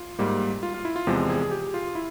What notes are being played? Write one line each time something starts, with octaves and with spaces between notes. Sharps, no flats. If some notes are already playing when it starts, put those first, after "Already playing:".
Already playing: F4
G#2 G3 A#3
F4
F4
E4
F4
E2 C3 F3 G#3 G4
G#4
G#4
G4
F4
E4